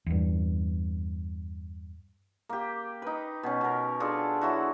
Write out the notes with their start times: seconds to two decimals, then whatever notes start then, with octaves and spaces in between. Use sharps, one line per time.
0.06 E2 G2
2.49 A#3 G4
3.02 D#4 B4
3.43 B2 C#4
3.61 B2 A#4
4.00 D4 F4 G#4 A4
4.41 F#3 E4 F#4